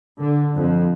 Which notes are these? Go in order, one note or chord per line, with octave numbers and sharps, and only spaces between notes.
D3
F2